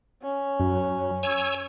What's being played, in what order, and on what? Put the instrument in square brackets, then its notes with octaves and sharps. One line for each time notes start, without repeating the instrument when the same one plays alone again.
[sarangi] C#4
[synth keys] F#2 [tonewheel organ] F#3
[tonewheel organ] C#5 G#5 E6